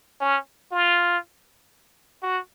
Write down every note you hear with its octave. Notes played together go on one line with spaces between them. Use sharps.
C#4
F4
F#4